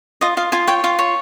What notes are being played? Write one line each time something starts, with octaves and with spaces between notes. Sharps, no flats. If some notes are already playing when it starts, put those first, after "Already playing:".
F4 D#5
F4 F5
F4 G#5
C#5 G5
F4 F5
C#5